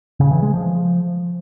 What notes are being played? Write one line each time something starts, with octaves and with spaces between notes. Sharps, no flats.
C#3
E3
G#3
F3